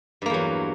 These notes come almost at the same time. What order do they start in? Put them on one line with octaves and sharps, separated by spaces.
G2 A#3 E2 F#3